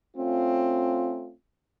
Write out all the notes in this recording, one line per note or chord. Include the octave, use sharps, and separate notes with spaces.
A3 C4 C#4 F4